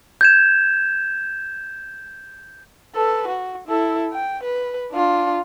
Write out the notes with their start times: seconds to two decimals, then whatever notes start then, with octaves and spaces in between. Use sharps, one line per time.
0.21 G6 G#6 E7
2.95 A4 B4
3.28 F#4
3.68 E4 A4
4.13 G5
4.43 B4
4.92 D4 F4